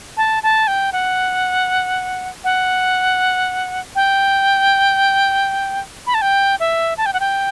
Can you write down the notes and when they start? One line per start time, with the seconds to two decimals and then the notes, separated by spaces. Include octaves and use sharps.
0.17 A5
0.43 A5
0.67 G5
0.93 F#5
2.44 F#5
3.95 G5
6.07 B5
6.14 A5
6.22 G5
6.60 E5
6.97 A5
7.06 G5
7.13 F#5
7.20 G5